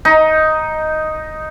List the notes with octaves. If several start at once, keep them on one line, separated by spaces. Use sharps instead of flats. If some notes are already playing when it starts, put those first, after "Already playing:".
D#4